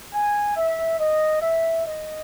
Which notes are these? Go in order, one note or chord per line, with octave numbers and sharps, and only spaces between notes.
G#5
E5
D#5
E5
D#5